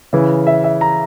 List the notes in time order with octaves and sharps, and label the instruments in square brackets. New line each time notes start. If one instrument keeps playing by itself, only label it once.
[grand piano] C#3 E3
E5
E5
A#5